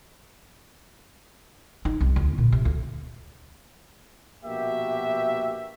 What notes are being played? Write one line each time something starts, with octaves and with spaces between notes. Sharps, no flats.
D#4
C2
D2
A#2
C3
D2
A#1 B2 A#3 F#4 G4 E5